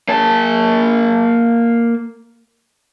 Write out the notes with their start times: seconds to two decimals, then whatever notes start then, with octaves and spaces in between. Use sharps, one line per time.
0.08 A#3 A5